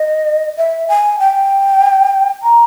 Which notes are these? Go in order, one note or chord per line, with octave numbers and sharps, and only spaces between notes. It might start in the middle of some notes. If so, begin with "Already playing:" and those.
Already playing: D#5
E5
G#5
G5
A#5